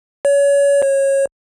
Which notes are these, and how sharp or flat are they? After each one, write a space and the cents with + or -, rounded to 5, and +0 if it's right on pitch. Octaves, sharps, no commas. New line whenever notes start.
C#5 +30
C#5 -20